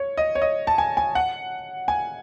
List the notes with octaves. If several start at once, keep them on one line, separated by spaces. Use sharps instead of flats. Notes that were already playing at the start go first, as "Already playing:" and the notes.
Already playing: C#5
D#5
C#5
D#5
A5
G#5
G#5
F#5
G#5